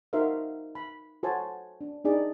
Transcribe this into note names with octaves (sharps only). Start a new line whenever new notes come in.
D#4 F#4 A#4 C5 E5 F5
B5
F#4 A4 C5 C#5 G#5 A5
D4
D4 D#4 G#4 D5